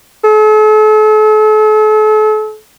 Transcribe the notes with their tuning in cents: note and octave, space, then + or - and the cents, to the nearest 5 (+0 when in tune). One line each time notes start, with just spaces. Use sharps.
A4 -40